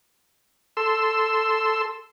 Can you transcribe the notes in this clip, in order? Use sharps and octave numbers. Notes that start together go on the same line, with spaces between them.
A4 C6 E6